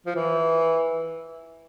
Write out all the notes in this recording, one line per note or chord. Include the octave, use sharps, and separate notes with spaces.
F3
E3